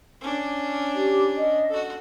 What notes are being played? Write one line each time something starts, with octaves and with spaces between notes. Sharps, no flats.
C#4 D4
G4
D#5
F#4 A4